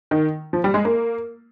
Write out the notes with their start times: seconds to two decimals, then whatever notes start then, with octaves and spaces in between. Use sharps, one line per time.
0.11 D#3
0.53 F3
0.64 G3
0.74 G#3
0.85 A#3